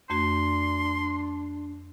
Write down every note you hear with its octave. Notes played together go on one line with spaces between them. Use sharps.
F2 A3 D4 F#4 C6